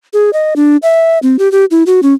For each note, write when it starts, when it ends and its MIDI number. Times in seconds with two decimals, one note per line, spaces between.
0.13 0.30 68
0.33 0.54 75
0.56 0.77 62
0.82 1.19 76
1.23 1.37 60
1.39 1.51 67
1.52 1.65 67
1.71 1.83 64
1.86 2.00 66
2.03 2.14 61